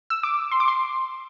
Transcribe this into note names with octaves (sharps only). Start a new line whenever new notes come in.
E6
D6
C6
D6
C6